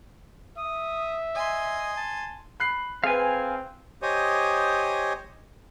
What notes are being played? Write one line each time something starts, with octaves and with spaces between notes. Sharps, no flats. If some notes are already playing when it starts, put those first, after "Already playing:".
E5 D#6
D#5 G#5 C6
A5
B5 F#6 C7
C4 G#4 B4 F5 G#5
G4 C5 C#5 D#5 G#5 D#6